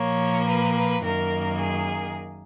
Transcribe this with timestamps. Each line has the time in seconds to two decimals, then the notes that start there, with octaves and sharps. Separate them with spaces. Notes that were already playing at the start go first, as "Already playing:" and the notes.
Already playing: A#2 F3 A#3 C#5
0.47 B4
0.76 B4
1.03 F#2 D#3 A#3 A#4
1.60 G#4